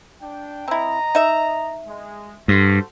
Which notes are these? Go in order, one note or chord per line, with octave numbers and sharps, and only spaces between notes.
D4 G5
C4 E4 D#5 A#5
D#4 E5
G#3
G2 F#4 A4 C5